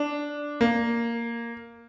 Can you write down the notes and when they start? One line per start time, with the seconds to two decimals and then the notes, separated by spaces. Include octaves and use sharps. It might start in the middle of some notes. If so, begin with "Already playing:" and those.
Already playing: D4
0.61 A#3